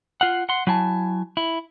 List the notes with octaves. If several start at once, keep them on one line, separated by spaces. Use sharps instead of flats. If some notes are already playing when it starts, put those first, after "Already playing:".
F4 F5 F#5
F#5 C6
F#3 E4 G#5 A5
E4